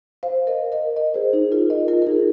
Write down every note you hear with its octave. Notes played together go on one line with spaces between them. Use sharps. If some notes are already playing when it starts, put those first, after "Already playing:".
C5 F5
A#4 D#5
A#4 D#5
A#4 D#5
G#4 C5
D#4 G#4
F4 A#4
A#4 D#5
F4 A#4
A#4
D#4 G#4